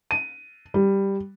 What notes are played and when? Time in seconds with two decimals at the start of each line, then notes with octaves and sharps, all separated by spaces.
0.11 D#7
0.74 G3